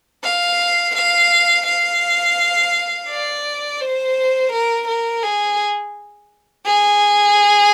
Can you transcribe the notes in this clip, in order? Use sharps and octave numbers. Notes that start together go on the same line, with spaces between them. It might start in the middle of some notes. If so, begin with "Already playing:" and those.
F5
F5
F5
D5
C5
A#4
A#4
G#4
G#4